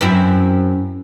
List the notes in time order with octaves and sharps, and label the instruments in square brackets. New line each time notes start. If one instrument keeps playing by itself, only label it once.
[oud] F#2 C4 E4